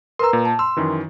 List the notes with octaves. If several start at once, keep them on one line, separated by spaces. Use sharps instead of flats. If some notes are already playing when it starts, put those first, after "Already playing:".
A#4 B4 A#5 C6 E6
A#2
A5
C6 E6
F#2 D#3 E3